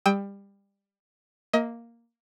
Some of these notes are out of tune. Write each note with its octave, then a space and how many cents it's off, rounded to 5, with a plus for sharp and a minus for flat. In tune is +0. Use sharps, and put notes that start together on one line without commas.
G3 +25 G5 +15 E6 -45
A#3 +0 D#5 +30